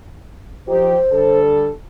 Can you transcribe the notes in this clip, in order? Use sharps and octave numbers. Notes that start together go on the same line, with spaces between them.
F3 D#4 G4 C5
D3 G3 A4